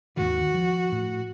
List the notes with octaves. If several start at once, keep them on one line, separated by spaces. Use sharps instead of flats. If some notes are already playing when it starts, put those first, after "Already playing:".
D#2 G#2 D#3 F#4
F3
A2